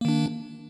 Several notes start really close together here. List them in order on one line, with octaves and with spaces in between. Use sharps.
A#3 D#3 D4